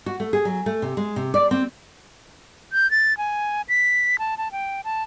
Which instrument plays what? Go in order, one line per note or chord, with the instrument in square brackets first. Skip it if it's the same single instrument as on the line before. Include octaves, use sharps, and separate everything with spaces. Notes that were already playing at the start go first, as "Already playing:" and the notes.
[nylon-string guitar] F#4
A3
G#4
F#3
A3
C3
G#3
C3
D5
C4
[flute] G6
A6
G#5
B6
A5
A5
G5
A5